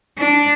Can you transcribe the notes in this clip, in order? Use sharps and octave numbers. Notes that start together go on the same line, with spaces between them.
D4